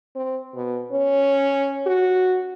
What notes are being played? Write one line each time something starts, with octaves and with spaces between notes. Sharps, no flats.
C4
B2
C#4
F#4